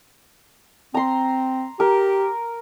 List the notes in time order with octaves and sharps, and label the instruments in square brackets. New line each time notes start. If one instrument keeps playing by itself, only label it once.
[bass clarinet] C4 [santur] A#5 C6
[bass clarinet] G4 [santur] A#4